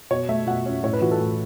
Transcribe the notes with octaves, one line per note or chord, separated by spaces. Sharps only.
B2 C#5
A3 E5
B2 F#5
C#4
A2 C#5
B4
E3 F#4
A4
A2